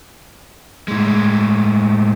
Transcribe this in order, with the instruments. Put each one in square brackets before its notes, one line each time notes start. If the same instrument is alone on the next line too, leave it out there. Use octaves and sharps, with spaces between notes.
[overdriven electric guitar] A2 G#3